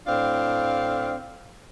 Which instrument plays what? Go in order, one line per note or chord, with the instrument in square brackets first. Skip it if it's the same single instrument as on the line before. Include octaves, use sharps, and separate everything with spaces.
[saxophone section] A2 C4 D4 F5